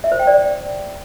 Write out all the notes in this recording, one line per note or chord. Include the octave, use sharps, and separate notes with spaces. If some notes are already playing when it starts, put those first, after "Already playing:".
E5
C5
G5
D5